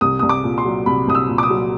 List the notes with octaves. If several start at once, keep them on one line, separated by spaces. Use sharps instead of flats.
C2 D#6
C2 D#6
D6
A#2
C6
F#3
C2 B5
C2 D#6
E6
A#2
D6
D#6
F#3